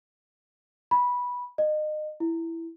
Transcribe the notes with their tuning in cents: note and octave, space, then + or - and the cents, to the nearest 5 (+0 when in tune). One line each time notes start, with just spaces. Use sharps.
B5 -10
D#5 -30
E4 +5